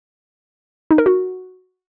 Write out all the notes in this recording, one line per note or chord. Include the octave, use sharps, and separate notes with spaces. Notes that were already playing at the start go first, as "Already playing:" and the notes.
D#4
A#4
F#4